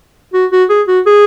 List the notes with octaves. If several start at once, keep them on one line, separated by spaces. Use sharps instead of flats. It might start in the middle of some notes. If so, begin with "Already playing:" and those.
F#4
F#4
G#4
F#4
G#4